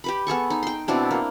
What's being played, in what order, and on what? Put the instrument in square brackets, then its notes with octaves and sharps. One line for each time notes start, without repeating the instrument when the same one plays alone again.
[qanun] G4 B4 B5
B3 G#4 A4 C#6
D#4
G5 C6
B2 C4 D4 E4
A#3